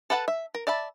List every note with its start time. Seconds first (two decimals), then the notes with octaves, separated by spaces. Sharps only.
0.10 A4 B4 F#5 G5 A5
0.28 E5
0.55 A#4
0.67 D5 E5 A5 B5